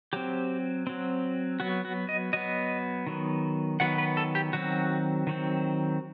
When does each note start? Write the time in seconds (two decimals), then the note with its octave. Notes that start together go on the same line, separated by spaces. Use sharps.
0.13 F#3 C4 G4
0.87 F#3 C4
1.60 F#3 B3 F#4
1.85 F#4
2.09 D#5
2.33 F#3 B3 D#5
3.07 D#3 F#3 B3
3.80 D#3 F#3 B3 F#5
3.98 B4
4.17 A4
4.35 G4
4.53 D#3 F#3 C4 F#4
5.27 D#3 F#3 C4